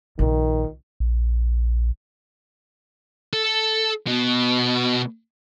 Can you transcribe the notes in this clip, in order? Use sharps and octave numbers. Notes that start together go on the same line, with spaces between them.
A#1 D#3
A#1
A4
B2